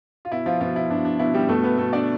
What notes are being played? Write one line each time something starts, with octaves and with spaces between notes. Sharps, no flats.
F4
B2 E4
F3 F4
B2 F3 F4
E4
B2 D4
D4
B2 E4
G3 G4
B2 A3 A4
B3 B4
B2 A3 A4
D4 D5